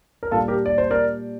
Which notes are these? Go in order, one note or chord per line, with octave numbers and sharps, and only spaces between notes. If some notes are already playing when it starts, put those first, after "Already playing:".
A#4
A#2 G3 D4 F4 A4
G4 A#4
D5
C5
A#4 D5